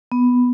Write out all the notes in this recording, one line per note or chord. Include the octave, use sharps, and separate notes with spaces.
B3